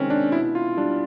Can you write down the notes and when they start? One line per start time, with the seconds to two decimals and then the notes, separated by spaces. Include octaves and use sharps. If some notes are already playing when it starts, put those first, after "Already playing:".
Already playing: C3 D#3 G#3 C4 C#4
0.10 D4
0.32 B2 E4
0.55 F4
0.77 G3 D4